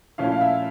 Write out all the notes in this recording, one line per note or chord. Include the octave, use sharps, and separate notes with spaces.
A#2 F3 A3 C#4 E4 F5
F5
E5